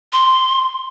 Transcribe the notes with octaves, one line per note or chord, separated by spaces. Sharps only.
C6